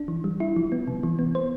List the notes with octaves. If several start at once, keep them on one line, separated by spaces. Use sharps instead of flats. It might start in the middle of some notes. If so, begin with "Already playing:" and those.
Already playing: D4
E3
G3
E4
F3
B3
C3
E3
B3
C5